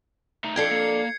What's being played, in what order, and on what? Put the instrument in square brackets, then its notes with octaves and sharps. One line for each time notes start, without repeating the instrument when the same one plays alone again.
[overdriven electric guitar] A3 D#4
[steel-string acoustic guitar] F2 D4 A4 [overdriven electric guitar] F5 G5 [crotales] G#6 C7 C#7
[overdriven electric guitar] A#3 [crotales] C#7